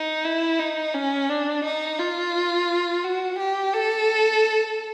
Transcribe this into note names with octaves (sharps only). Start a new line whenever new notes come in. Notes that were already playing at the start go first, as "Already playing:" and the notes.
Already playing: D#4
E4
D#4
C#4
D4
D#4
F4
F#4
G4
A4